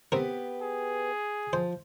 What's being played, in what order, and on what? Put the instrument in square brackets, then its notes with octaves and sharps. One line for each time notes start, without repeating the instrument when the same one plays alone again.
[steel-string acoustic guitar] B3 G4 B4 [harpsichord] C4 A#4
[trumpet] G#4
[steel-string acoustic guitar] F3 [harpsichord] C5